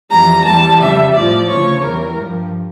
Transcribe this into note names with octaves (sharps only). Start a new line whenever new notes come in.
F2 E3 G3 A#5
E2 E3 G3 A5
F2 C#3 G3 E5
A2 F3 D5
D2 C#3 F3 C#5
E2 E3 G3 A#4
G2 F3